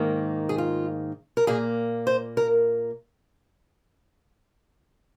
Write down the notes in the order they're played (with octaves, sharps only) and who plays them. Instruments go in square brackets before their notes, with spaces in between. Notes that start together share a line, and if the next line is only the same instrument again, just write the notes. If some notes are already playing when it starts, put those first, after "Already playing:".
Already playing: [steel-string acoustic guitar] G#2 D#3 A#3
G#4
F4
A#4
A#2 A#3 G#4
C5
A#4